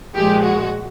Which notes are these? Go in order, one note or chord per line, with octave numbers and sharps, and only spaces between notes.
A#2 F3 G#3 G4
F#4